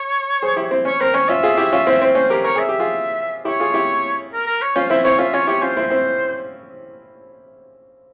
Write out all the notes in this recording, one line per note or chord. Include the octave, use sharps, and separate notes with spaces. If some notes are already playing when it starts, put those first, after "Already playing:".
Already playing: C#5
G#4 C5
E4 G4
C4 E4
C#4 C#5
C4 A#4
C#4 C#5
C#4 F4 E5
F4 G#4
E4 G4
C#4 F4
C4 E4
C4
C#4 C5
G4 A#4
A#4 C#5
G#4 E5
G4
F4 G#4
E4 G4 C#5
F4 G#4
E4 G4
A#4
A#4
C#5
C#4 F4 C5
C4 E4 E5
C4 E4 C#5
C#4 F4 E5
C#4 F4 C#5
E4 G4 C#5
C#4 F4 C5
C4 E4
C4 E4